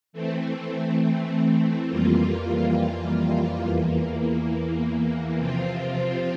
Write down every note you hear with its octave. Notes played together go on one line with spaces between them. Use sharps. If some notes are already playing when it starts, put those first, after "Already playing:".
E3 A3 C4
F2 E3 G3 A#3 F4
E2 E3 A#3
C3 F3 C4 F4